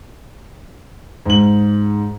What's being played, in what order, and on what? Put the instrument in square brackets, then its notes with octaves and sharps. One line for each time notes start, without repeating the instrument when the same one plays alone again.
[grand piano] G#2 F#7